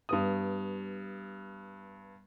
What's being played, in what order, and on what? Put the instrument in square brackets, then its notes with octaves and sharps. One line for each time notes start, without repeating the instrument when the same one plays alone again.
[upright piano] G2 B3 D#6